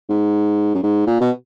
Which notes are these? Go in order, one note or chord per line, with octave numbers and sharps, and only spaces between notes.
G#2
F#2
G#2
A#2
B2